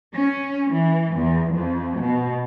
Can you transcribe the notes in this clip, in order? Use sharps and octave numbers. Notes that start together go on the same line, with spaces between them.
C#4
E3
E2
F2
B2